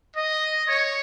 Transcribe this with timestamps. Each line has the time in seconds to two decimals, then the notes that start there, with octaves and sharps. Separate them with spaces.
0.16 D#5
0.68 C#5